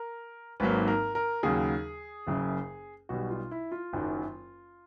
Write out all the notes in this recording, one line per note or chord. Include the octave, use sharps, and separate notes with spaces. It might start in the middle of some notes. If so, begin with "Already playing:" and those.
Already playing: A#4
G#1 G#2 D#3 F#3 A#3 B4
A#4
A#4
D#2 C#3 F#3 G#4
F#1 F#2 C#3
B1 B2 G3 F#4
F4
E4
F4
F#1 F#2 D#3 F#3